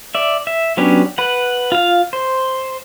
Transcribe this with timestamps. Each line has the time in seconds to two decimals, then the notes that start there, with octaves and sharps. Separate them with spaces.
0.15 D5 E5
0.47 E5
0.77 F#3 B3 C#4 D4 G4
1.18 B4 F#5
1.72 F4 F5
2.13 C5